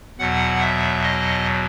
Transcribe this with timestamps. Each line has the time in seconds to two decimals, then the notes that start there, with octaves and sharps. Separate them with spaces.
0.19 E2 B2 F#3 F#5
0.61 E5
1.03 D#5